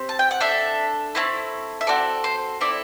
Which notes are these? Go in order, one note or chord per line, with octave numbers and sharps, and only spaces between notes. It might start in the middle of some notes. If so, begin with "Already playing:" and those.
Already playing: C4 G4
A5
G5
F#5
D4 A4 E5
A3 C4 E4
E5
C4 F#4 A4 D5
C5
C4 E4 A4 D5